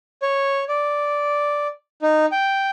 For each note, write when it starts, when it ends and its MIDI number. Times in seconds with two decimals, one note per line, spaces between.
0.22 0.64 73
0.69 1.67 74
2.02 2.26 63
2.32 2.70 79